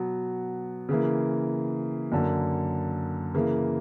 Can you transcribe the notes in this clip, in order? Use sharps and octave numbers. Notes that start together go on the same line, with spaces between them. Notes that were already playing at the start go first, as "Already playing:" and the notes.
Already playing: B2 F#3 B3
C#3 E3 A#3
F#2 D3 A#3
C#3 E3 A#3